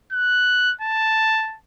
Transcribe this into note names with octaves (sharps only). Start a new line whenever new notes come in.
F#6
A5